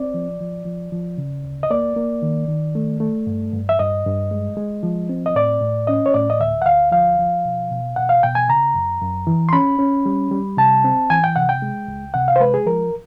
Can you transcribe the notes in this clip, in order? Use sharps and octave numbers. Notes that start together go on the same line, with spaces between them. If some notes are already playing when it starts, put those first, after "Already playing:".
Already playing: C4 D5
F3
F3
F3
F3
C#3
D2
D#5
A#3 D5
A#3
D#3
D#3
A3
A3
G2
G2
E5
G2 D#5
G2
G#3
G#3
F3
C4
D#5
A2 D5
A2
C#4 D#5
C#5
A2 D5
D#5
D2 E5
F#5
D2 F5
F3 F5
F3
B2
B2
B2 F#5
F5
B2 G5
G#5
C#3 A#5
F#2
F#2
E3
C6
C#4 B5
C#4
G3
G3
C3 A5
C4
E3 G#5
G5
C3 F#5
G5
G#3
C#2
C3 F#5
F5
C5
G#3 B4
G#4
F3 A#4